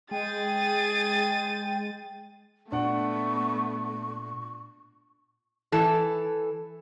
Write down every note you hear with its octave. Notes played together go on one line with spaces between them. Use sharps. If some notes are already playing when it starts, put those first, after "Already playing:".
G#3 G#4 G5 A6 D#7
A#2 A3 B3 D4 F#5 C#6
E3 A4